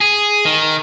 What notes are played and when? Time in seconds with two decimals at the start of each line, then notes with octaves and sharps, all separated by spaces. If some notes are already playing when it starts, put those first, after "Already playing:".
0.01 G#4
0.45 D#3